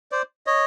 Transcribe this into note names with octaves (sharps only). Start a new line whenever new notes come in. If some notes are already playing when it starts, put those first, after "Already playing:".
C5 D5
C#5 D#5